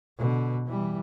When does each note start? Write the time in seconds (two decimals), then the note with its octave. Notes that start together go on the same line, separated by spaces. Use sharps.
0.18 B2 D3
0.66 E3 G3